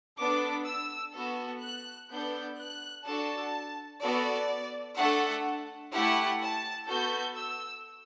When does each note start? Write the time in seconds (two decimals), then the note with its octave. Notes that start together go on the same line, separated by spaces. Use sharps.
0.19 B3 D4 A4 D6
0.66 E6
1.14 B3 F#4 A4
1.62 F#6
2.10 B3 D4 A4 G6
2.58 F#6
3.06 D4 F#4 A4 A5
4.01 B3 F#4 A4 D5
4.97 A3 D4 A4 F#5
5.93 A3 E4 G4 F#5
6.41 A5
6.88 B3 F#4 A4 G6
7.37 E6